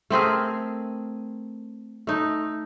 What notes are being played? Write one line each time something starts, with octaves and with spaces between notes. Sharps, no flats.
A3 C4 G#4 A#4
A3 D#4